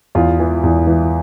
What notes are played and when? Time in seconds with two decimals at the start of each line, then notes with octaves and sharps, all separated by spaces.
0.15 E2 F4
0.39 E3
0.63 E2
0.87 E3